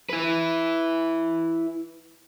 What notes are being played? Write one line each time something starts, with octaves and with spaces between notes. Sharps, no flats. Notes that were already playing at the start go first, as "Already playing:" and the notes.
E4 B4